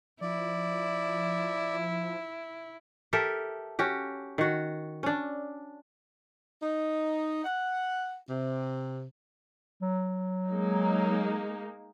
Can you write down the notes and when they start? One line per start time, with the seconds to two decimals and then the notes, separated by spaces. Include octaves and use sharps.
0.21 F3 E4 D5
3.13 G4 A4 A#4 E5
3.79 C#4 F#4 G4
4.38 D#3 F#4
5.03 C#4 D4
6.62 D#4
7.45 F#5
8.30 C3
9.82 F#3
10.50 G#3 A#3 D#4